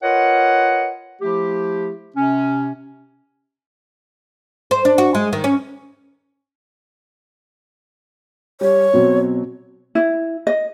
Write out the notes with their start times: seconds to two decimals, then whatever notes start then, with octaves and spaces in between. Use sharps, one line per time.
0.02 F4 A#4 B4 C#5 D#5 F#5
1.21 F3 A3 E4 G4
2.16 C3 C#4
4.71 C5
4.85 D4
4.98 F#4
5.15 G#3
5.33 D#3
5.44 C#4
8.61 G3 G4 C#5
8.93 B2 F#3 C4
9.95 E4
10.47 D#5